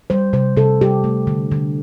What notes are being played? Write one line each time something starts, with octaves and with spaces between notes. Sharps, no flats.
G3 C5
C3 C5
C3 A4
G3 G4
A3
D3
D3